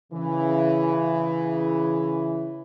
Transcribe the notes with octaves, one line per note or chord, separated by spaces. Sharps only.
C#3 E3